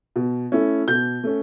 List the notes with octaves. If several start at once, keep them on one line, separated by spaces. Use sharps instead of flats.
B2
A3 C#4 E4
B2 G6
A3 C#4